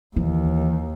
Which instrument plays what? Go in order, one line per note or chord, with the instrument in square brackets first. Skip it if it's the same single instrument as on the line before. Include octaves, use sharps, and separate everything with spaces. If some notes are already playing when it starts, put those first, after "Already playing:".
[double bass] D#2 [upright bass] E3